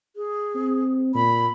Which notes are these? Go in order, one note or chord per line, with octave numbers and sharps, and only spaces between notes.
G#4
C4
A#2 B5